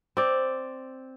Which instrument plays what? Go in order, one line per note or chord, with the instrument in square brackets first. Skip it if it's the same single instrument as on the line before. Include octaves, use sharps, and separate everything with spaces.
[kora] C4 D5